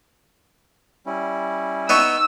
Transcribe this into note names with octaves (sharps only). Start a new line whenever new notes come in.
G3 C#4 E4
B3 D#4 C#6 E6